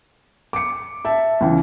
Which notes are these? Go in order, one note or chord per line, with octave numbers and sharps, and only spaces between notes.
D6 C#7
E5 A5
C#2 C#3 E3